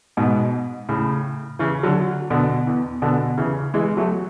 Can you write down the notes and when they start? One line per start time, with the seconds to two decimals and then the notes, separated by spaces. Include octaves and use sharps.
0.17 G#2 B2
0.89 A2 C#3
1.59 C#3 E3
1.83 D3 F#3
2.30 B2 D3
2.67 E2
3.02 B2 D3
3.37 C#3 E3
3.74 E3 G#3
3.97 F#3 A3